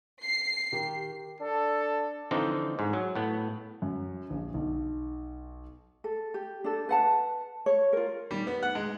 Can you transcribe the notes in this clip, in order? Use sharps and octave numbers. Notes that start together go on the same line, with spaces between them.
C7
D#3 G4
D4 A4
D3 E3 F3 C4 D#4
G#2
F#3
A2 B3
F#2
A#1
B1
A4
G4
D4 A4
B4 F#5 A5
C#5
F4 A#4
G3
B3
F#5
G#3